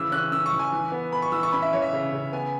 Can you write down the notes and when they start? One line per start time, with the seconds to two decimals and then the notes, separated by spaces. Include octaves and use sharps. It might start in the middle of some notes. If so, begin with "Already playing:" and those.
Already playing: C#3 E3 E6
0.12 C#4 F#6
0.32 C#4 E6
0.46 C#6
0.53 E3
0.59 G#5
0.72 E3
0.92 B3
1.12 B3 B5
1.22 C#6
1.32 E3 E6
1.43 C#6
1.52 C#4 B5
1.62 E5
1.73 E3 C#5
1.82 E5
1.93 C#3
2.12 C#3
2.32 B3 G#5